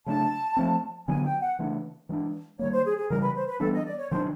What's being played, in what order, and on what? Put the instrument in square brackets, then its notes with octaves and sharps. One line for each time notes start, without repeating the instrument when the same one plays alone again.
[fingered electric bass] C#3 F#3 A3 D4 [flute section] A5
[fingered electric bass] F3 A3 C4
[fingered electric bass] D3 F#3 B3 [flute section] G#5
[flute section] G5
F#5
[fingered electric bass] C#3 E3 A3 D4
E3 G#3 B3 D4
[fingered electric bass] D#3 G3 A#3 [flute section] C#5
[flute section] C5
G#4
G#4
[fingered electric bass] C#3 E3 G3 [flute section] A#4
[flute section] B4
C5
B4
[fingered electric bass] E3 G3 B3 D4 [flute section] A4
[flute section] D#5
D5
C#5
[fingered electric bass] D#3 F#3 B3 D4 [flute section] C5